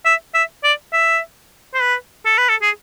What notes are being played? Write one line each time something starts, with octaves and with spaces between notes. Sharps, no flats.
E5
E5
D5
E5
C5
B4
A4
B4
A4
G#4